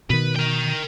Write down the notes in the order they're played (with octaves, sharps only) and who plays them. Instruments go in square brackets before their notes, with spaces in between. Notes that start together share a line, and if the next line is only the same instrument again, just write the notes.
[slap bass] B2 D#3 [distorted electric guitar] B4
[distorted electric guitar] A#4 G5